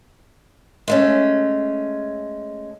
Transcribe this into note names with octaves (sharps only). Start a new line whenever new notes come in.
G#3 A3 C#4